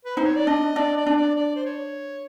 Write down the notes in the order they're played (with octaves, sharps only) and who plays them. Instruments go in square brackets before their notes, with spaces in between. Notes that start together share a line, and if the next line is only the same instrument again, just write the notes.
[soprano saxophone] B4
[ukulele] D#4 [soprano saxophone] C5
[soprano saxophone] C#5
D5
[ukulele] D4 [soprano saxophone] D#5
[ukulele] D4 [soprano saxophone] D5
[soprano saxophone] D5
[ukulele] D4
[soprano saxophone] D5
D5
C5
C#5